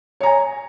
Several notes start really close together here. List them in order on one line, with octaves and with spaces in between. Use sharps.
C#5 A#5 G#5